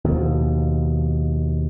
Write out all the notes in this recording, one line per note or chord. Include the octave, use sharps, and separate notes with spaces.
D#2 B2 F3